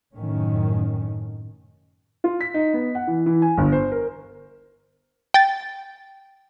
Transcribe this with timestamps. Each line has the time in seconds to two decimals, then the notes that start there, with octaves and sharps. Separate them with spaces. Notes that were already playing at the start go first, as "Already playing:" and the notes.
0.15 F1 F#2 A2 D#3 C#4
2.24 F4
2.41 B6
2.54 D#4
2.74 B3
2.95 F#5
3.07 E3
3.26 E3
3.42 G#5
3.58 G1
3.72 C5
3.92 A#4
5.34 G5 A6